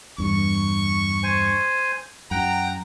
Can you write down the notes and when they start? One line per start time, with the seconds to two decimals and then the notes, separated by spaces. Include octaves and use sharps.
0.18 E2 G2 C#6
1.23 C5 G#5
2.31 F#2 F#5 G5 A#5